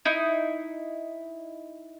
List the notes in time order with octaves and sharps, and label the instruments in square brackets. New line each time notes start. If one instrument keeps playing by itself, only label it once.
[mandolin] D#4 E4